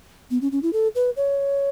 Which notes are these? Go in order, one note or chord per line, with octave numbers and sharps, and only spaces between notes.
B3
C#4
C#4
E4
A4
B4
C#5